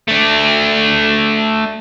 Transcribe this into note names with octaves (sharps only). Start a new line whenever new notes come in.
A3 D4